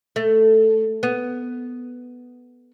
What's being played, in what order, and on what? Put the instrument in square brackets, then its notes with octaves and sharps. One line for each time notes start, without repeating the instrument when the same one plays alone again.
[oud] A3
B3